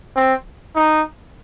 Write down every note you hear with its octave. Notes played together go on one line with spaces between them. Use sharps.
C4
D#4